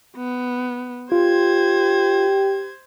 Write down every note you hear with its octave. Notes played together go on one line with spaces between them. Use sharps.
B3
F4 G4 C5 G#6